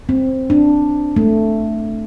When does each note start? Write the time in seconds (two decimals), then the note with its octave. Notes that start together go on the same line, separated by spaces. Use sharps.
0.09 C4
0.50 D4
1.16 A3